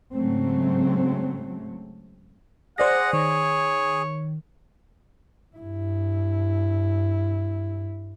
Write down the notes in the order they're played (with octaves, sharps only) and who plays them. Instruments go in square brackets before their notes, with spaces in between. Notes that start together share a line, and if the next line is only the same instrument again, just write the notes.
[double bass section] G#2 C#3 F#3 A3 C4
[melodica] G#4 [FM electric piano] C5 D5 A#6 [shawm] F#5
[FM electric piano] D#3 [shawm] C#5
[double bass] G2 E4